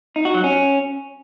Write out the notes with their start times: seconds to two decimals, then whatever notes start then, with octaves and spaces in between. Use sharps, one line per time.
0.16 D#4
0.25 F#4
0.34 F#3
0.44 C#4